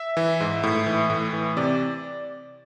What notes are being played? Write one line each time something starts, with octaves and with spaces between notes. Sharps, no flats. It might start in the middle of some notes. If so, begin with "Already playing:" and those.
Already playing: E5
E3
G#2
A2
E3
A2
E3
C3 D5